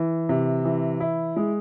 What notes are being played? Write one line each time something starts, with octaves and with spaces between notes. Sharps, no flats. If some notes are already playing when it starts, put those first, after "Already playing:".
Already playing: E3
C3
E3
E4
G#3